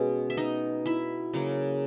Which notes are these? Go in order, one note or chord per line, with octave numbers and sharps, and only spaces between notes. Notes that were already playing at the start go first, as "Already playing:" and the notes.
Already playing: B2 G#3 B3 C#4
E5
D#4 D#5
E4 E5
C#3 F#3 A#3